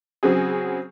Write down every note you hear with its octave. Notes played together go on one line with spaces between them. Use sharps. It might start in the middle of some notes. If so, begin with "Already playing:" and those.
C#3 F#3 C4 G#4